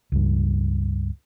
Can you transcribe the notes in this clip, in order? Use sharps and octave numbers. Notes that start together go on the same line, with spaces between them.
C#2 G2